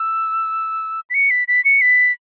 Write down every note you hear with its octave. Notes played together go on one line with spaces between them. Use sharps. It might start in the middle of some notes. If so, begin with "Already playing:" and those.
Already playing: E6
B6
C#7
B6
B6
C#7
B6